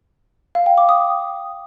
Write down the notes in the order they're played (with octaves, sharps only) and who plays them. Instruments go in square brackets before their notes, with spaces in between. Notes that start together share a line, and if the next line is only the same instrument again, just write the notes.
[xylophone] F5
G5
D6
D#6